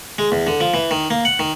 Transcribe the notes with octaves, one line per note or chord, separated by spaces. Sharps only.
G#3
E2
D3
F3
E3
D#3
A#3
F#5
D#3